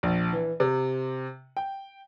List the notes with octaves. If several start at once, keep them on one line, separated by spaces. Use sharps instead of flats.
A#1
E3
C3
G5